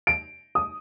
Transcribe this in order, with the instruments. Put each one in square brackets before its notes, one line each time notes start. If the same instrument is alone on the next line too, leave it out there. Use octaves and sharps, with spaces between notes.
[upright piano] D7
D#6